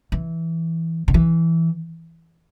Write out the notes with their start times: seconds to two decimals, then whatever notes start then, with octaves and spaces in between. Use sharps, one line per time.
0.12 E3
1.08 D3
1.14 E3